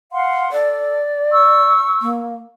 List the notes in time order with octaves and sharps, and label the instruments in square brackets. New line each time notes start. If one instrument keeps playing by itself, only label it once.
[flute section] F5 F#5 C6
[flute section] A4 [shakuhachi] D5
[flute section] C#6 E6
[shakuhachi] A#3